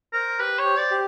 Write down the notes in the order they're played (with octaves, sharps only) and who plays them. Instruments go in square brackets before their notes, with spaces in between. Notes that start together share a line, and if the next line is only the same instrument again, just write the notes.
[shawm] A#4 [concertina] C5
[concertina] G4 [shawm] B4
[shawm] C#5
[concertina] C5
[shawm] D5
[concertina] G4